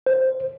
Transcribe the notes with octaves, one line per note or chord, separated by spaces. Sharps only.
C5